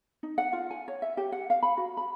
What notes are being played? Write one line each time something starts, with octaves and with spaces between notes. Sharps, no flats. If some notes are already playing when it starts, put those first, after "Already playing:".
D#4
F#5
F4
G#5
C#5
E5
G4
F#5
F5
B5
F#4
B5